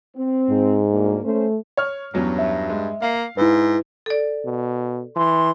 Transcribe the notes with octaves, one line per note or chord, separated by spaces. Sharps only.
C4
G#2
D2 A#3
A3 C#4 C5
C#5 F6
E2 G2 F#3 C#4
E5
G#3
A#3 F5
G#2 E4 B4
A4 D5
B2
E3 C6